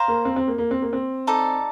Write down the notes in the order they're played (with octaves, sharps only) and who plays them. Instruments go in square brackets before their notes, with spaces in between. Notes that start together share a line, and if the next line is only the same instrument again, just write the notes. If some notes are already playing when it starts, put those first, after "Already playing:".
Already playing: [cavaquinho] C5 F5 A#5
[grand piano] A#3
C4
C4
A#3
A#3
C4
A#3
C4
[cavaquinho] D#4 A4 D5